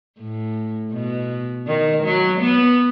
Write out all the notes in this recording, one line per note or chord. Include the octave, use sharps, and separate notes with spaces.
A2
B2
D#3
F#3
B3